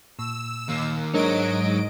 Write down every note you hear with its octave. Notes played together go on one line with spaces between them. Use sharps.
A#2 E6
D#2 A#3
G#2 F#3 D4 A#4 C#5 D#5 D7